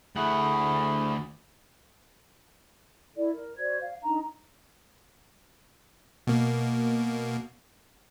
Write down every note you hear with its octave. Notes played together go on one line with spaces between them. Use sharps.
D2 A3 E4 G#4 F#5
E4 A4 D5
A#4
F#4 C5 D5 G#6
F5
D4 D#4 A#5
B2 A#3